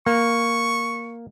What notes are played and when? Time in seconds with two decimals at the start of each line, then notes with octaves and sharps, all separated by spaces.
0.06 A#3 C#6